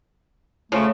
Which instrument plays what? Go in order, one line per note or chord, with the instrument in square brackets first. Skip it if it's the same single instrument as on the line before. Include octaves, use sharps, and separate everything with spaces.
[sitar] C#3 [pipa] F3 [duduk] A3